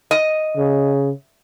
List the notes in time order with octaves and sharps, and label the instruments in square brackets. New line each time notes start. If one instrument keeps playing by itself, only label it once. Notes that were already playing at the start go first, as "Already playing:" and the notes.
[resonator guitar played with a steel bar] D#5
[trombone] C#3